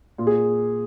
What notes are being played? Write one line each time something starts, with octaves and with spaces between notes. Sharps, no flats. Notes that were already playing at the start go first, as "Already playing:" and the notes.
A#2 F4
G#4